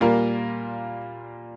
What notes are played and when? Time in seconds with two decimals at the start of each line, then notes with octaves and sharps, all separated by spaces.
0.01 A#2 G3 A#3 F4 A#4